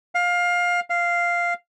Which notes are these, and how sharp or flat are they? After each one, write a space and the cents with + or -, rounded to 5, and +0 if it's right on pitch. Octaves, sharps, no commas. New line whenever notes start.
F5 +20
F5 -5